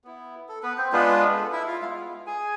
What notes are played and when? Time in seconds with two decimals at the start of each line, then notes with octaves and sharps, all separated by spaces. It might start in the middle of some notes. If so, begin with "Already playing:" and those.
0.04 B3 E4
0.49 A4
0.63 B3 B4
0.77 C4 C5
0.92 G#3 B3 D4 F4 B4
1.37 A4
1.52 E4 E5
1.67 F4 F5
1.82 G#3 B3 E4 F4 F5
2.26 G#4 G#5